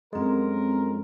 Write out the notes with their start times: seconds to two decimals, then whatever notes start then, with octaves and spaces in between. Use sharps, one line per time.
0.13 F#2 F3 G#3 C4 A4 A#4